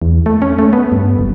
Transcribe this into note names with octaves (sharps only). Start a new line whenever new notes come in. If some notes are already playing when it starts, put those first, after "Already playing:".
E2
A3
C#4
A3
B3
G2
F#1